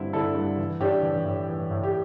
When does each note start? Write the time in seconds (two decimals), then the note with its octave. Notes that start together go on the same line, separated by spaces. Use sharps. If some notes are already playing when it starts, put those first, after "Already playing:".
Already playing: G2 D3 C4 E4
0.13 D3 E4 A4
0.35 G2
0.58 E3
0.80 A2 D4 G4
1.03 E3
1.25 A2
1.49 E3
1.71 A2
1.83 G4